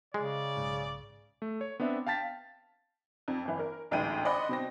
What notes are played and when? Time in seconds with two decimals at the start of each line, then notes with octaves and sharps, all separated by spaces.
0.14 C#3 G#3 D5
0.57 B1 G#2
1.42 A3
1.61 C#5
1.80 B3 C4 D4 E5
2.07 F5 G5 A5 A6 B6
3.28 F2
3.45 G1 E3
3.59 A#4
3.91 A1 D2 G#2 E3 G5 D#7
4.25 C5 D5 D#5 F#5 B5 C6
4.49 B2 C4 A#6